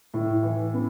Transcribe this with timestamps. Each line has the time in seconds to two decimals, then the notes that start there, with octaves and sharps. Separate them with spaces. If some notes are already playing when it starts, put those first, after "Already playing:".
0.14 A2
0.43 E3
0.74 B3